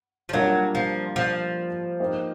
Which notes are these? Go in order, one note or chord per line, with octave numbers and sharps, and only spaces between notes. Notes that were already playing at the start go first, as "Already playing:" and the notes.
F3
F#3 G3 A#3 D4 F4 A#4
F3
F3
A#3 D#4 G4 C5